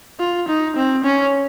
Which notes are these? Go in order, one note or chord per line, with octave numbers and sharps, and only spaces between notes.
F4
D#4
C4
C#4